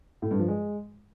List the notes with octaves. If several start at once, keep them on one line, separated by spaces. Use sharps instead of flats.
A2
G2
F3
G#3